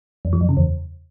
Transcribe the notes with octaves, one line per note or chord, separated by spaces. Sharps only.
F2
F3
F#2
C#3
E2